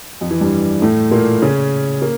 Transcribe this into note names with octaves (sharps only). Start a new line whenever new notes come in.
F2 F3
E3
G2 G3
A2 A3
A#2 A#3
C#3 C#4
A#3